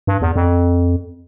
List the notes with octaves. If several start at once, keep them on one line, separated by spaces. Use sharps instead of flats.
G2
E2
F2